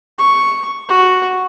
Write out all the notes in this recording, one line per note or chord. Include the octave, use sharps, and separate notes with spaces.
C#6
F#4